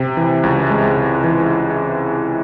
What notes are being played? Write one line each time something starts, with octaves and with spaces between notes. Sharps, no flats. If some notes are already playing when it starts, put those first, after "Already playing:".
Already playing: C3
E3
C#2
G#3
C3
E3